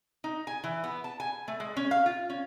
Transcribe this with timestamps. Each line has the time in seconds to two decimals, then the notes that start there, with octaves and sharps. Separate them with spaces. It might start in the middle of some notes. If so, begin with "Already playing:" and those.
0.24 D#4
0.47 G#5
0.64 E3
0.84 B3
1.04 A5
1.20 G#5
1.48 A3
1.60 G#3
1.77 C#4
1.91 F5
2.06 F4
2.30 C#4